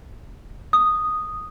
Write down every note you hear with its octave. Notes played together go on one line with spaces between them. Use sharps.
D#6